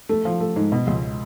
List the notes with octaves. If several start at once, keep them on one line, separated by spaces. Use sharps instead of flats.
A3
F3
A3
G#2
B2
C#2